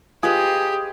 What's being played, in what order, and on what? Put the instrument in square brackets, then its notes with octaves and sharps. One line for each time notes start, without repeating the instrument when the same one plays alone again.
[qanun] F4 B4 D#5 [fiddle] G4 [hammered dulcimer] G#4